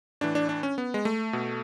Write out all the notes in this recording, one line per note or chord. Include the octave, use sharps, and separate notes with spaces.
A2 E3 D4
D4
D4
C#4
B3
G#3
A3
B2